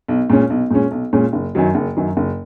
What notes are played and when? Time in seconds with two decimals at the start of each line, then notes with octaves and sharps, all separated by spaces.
0.08 B1
0.30 A#2 G#3 C#4
0.50 B1
0.71 A#2 G#3 C#4
0.91 B1
1.13 A#2 G#3 C#4
1.33 F#1
1.55 F#2 D#3 F#3
1.75 F#1
1.96 F#2 D#3 F#3
2.17 F#1